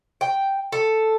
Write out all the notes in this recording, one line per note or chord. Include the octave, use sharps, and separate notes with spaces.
G5
A4